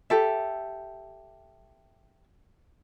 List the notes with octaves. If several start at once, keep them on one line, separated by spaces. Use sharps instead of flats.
G4 A4 E5